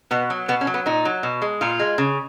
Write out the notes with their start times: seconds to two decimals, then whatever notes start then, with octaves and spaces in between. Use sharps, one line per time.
0.11 B2 B3
0.30 F#3
0.48 B2 B3
0.61 C#4
0.67 F#3
0.74 B3
0.86 A#2 D#4
1.05 F#3
1.23 B2
1.42 G#3
1.61 A#2 F4
1.79 G#3
1.98 C#3